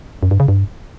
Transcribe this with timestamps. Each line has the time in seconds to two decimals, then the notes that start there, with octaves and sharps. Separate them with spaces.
0.23 F#2
0.31 G2
0.40 C#3
0.48 G2